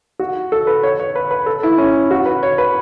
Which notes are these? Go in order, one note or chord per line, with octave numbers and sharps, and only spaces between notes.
F#4
A4
B4
C#5
C#5
B4
B4
A4
E4
C#4
F#4
B4
C#5
B4